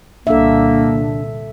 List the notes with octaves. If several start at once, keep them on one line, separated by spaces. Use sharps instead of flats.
C2 A#2 D3 A#3 D4 A4 E5